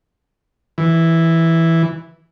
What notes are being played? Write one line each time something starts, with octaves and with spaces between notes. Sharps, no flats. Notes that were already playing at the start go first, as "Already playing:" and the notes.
E3